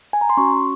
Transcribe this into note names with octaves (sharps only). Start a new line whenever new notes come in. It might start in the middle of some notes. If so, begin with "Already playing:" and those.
G#5
A#5
C6
C#4 F#4 C#6